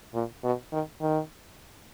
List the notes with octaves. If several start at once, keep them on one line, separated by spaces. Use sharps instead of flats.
A#2
B2
D#3
D#3